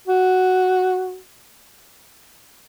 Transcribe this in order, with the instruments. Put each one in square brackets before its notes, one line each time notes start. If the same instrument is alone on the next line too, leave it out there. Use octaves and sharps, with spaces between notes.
[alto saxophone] F#4